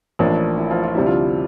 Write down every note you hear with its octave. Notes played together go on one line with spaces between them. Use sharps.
A1 A2 F3 A#3 D4
E4
F3 F4
F4
D2 C3 G3 D4 E4
F3 F4